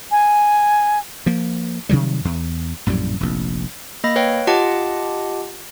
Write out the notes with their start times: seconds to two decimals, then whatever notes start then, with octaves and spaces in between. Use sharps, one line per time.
0.11 G#5
1.26 F3 A#3
1.89 C3 D#3 F#3 G3
2.25 E2
2.86 A#1 F#2 A2 G3
3.20 F1 A#1
4.04 A#3 D#5 B5 A#6
4.16 B4 C#5 F5 G5
4.47 F4 G4 D#5 F#5 A5 D6